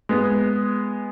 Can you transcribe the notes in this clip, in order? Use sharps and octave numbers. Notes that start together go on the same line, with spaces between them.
G#3 B3